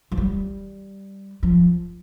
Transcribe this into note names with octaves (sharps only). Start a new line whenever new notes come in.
F3
G3
F3